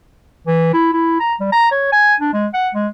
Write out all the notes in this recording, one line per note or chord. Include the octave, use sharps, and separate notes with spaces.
E3
E4
E4
A#5
G3
A#5
C#5
G#5
D4
G#3
F#5
G#3